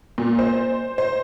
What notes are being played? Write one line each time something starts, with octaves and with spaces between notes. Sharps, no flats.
A#2
C5
C5